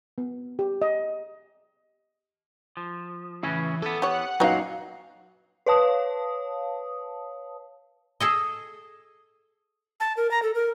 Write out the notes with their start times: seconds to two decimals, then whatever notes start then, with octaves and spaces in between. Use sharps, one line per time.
0.18 B3
0.59 G4
0.82 D#5
2.77 F3
3.43 A2 C#3 E3 C#4
3.82 E3 B3 A4
4.02 G4 C#5 F#5
4.40 F#2 A#2 F#3 B3 C#4 D#4 F#4 F5
5.66 B4 C#5 F5 A5 D#6
8.20 G#4 A4 D#5
10.00 A5
10.17 A#4
10.31 A#5
10.43 A4
10.55 A#4